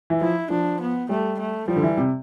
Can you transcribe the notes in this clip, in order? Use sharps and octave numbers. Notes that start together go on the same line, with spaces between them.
E3
F3 E4
F3 D4
B3
G3 A3
A3
F3 G3
D3
E3
C3